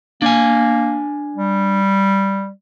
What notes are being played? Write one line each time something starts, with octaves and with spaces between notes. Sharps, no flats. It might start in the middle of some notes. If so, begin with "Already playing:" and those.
A#3 D4 G#5
G3